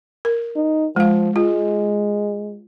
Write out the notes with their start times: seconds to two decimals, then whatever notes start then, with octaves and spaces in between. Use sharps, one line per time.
0.25 A#4
0.55 D#4
0.96 F3 G#3 F5
1.36 G#3 F4